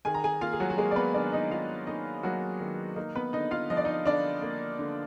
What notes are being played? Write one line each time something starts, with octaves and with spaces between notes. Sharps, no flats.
D#3 G#4 G#5
A#5
G#4 G#5
A#3 F4 F5
G#4
F#3 F#4
F#4
G#3 A#3 G#4
D5
B3 B4
D#3 D4 D5
D#4 D#5
D#3 F4 F5
A#3 D#4 D#5
F#3 A#3 F#4
D#3
A#3 D#4
B3 B4
D3 D#4 D#5
F4 F5
F3 D#5
D5
D#4 D#5
D3 D4 D5
A#3
D3